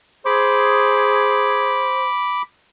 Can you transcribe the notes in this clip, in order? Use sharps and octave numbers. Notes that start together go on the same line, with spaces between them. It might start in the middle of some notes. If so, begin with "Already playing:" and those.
G#4 C5 B5 D6